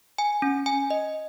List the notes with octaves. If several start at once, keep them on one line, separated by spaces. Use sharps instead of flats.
G#5
C#4
G#5
D#5